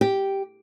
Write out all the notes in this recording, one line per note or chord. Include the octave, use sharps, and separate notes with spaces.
G4